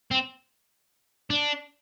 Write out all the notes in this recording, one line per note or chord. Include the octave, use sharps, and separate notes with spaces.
C4
D4